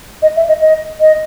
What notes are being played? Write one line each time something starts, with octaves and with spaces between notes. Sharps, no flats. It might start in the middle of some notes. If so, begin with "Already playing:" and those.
D#5
E5
D#5
D#5
D#5